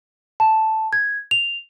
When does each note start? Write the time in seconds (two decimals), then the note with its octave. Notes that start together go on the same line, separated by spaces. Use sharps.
0.40 A5
0.93 G#6
1.31 F7